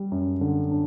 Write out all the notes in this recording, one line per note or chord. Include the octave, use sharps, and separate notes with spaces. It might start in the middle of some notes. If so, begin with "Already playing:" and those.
Already playing: G3
F#2
D3
D4